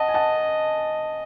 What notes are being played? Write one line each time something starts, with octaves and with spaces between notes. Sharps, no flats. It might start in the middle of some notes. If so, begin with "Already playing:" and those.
Already playing: D#5 F#5 A5
G#5
F#5 A5